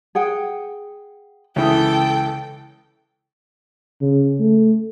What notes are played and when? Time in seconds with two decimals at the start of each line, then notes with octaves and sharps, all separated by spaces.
0.15 G#4 F#5 G5
1.56 C#2 E3 A4 E5 G5 D#6
4.01 C#3
4.40 A3